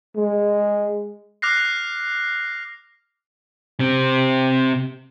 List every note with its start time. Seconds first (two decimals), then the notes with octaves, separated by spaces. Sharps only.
0.16 G#3
1.42 D6 F6 F#6 A#6 C7
3.79 C3 C4